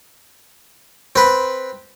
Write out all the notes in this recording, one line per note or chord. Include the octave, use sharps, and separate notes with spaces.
C4 B4